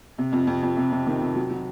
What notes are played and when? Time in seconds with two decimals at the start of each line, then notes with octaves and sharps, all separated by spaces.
0.18 C3
0.32 F2
0.47 F2
0.63 F2
0.77 C3
0.92 C3
1.07 D#3
1.21 C3
1.35 F#3
1.50 F#3